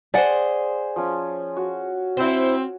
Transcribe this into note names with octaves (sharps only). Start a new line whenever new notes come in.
G#4 C5 D5 F#5
F3 C#4
F#4
C4 E4 C5